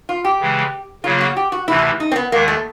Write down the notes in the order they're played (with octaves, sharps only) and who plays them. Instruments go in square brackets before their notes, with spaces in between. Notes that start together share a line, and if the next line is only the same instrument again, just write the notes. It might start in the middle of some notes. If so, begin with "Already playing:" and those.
[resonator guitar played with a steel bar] F4
G4
[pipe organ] C#3 E3 G#3
[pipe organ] C#3 F#3 A#3 [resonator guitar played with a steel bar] F4
[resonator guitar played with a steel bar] F#4
G4
F#4
[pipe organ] D2 C3 E3 [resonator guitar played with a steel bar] E4
[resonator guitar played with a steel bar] D#4
C4
B3
[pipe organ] D#2 D#3 G#3 [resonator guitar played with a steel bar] A#3
[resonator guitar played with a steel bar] A3